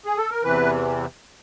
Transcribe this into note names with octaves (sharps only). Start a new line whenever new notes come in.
G#4
A4
A#4
E2 C3 E3 B4